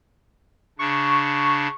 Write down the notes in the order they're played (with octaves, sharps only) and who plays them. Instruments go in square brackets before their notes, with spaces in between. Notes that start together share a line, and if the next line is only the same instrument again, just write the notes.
[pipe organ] C#3 D4 [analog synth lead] C#6